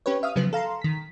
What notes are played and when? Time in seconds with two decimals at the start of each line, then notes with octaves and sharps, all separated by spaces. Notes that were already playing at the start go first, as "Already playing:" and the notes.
0.06 C#4 G4 B4 C#5
0.23 E5 F5 D#6 F6
0.36 C#3 F3 F#3 B3
0.53 A4 F5 A#5 C6
0.82 D#3 B6